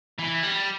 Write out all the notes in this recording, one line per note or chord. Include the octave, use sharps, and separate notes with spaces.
E3
G3